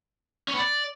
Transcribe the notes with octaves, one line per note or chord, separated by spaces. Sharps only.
C#4
B3
D5